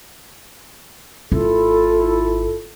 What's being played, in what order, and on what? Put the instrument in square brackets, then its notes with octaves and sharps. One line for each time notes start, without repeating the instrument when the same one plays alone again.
[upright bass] G#1 [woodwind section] E4 F4 A4